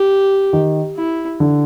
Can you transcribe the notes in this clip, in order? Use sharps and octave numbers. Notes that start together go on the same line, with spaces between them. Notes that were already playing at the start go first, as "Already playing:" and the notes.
Already playing: G4
D#3
E4
D3